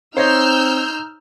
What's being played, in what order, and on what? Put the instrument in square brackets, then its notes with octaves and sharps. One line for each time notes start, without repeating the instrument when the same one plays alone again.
[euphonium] C4 [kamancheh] D#4 [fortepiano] C5 C#5 D#5 [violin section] E6 F6 G6